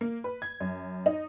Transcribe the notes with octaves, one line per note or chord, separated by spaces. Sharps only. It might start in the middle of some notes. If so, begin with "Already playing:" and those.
A#3
B4
G#6
F#2
D#4